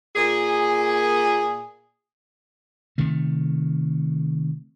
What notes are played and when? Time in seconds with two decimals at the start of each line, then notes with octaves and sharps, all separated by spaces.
0.15 A#2 G#4
2.98 C3 D#3 A3